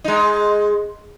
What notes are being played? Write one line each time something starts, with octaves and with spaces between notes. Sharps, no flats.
G#3 D#4